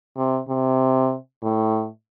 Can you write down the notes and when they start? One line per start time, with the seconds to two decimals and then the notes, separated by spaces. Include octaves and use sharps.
0.17 C3
0.49 C3
1.43 A2